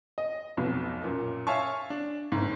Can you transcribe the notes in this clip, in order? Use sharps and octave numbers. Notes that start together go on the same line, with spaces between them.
D#5
F1 B1 B2
F#2 A#2
C#5 E5 F5 G#5 A5 C#6
D4
G1 G#2